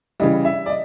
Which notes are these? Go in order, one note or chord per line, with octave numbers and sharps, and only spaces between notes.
C#3 E3 G3 D#5
E5
D5
D#5